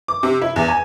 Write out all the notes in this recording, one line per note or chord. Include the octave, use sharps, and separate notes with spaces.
D6
C3
E4
E2
G#5